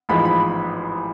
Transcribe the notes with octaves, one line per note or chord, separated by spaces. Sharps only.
A1 G#2 F3 G#3 B5
B5